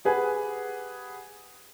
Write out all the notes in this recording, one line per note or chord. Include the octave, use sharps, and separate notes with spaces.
G4 G#4 B4 F#5 G#5